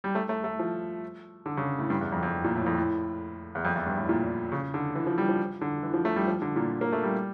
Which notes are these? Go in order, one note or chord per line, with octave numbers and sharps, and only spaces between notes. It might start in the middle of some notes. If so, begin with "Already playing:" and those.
G3
A3
A3
A3
F3
D3
C#3
A2
G2
E2
F2
F2
A#2
A2
F2
A2
E2
F2
E2
G2
A2
A#2
C#3
D3
E3
F3
G3
F3
D3
E3
F3
A3
G3
F3
D3
A#2
A#3
A3
G3